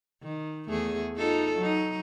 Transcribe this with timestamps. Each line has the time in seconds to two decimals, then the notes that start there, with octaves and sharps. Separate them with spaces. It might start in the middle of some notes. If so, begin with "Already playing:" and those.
0.23 D#3
0.69 E2 A3 G#4
1.17 D#4 F4 A4
1.57 F#3 D#4